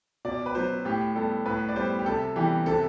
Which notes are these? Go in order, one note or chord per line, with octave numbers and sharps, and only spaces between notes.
B2 D5
B4
F#3 B3 C5
A2 G4
G3 B3 A4
A2 B4
D5
G3 B3 C5
G4
C3 A4
E3 G3 B3 G4
C3 A4